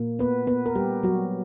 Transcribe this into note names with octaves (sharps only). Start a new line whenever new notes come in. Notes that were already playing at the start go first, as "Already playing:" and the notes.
Already playing: A#2 A#3
B3 B4
B3 B4
A#4
G3 G4
F#3 F#4